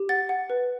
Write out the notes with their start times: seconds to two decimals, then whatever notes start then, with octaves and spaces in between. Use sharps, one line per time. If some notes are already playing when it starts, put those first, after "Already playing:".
Already playing: G4
0.09 F#5 A6
0.29 F#5
0.50 B4